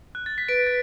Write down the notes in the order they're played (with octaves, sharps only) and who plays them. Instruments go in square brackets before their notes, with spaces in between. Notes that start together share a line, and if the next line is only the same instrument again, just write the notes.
[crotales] F#6
A6
B6
[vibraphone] B4 [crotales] D7
[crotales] A6